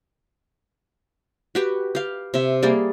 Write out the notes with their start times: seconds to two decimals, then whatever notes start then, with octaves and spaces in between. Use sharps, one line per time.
1.55 F#4 G4 B4
1.95 G4 F5
2.34 C3 E5
2.63 G3 A#3 G4 G#4